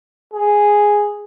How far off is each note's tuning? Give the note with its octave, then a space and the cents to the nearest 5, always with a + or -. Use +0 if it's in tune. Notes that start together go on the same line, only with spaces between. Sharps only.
G#4 -5